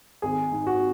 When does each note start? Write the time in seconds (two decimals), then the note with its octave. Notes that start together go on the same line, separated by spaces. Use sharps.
0.22 G#1 G#4
0.52 G#2
0.67 F#4